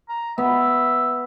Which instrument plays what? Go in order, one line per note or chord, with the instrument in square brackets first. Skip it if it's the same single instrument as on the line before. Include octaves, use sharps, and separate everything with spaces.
[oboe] A#5
[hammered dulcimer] B3 [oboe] E5